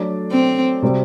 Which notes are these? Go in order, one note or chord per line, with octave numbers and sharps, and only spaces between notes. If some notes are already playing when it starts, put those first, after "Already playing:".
Already playing: F#3 A3 D4 A4 D5
C4
C3 G3 C4 F#4 C5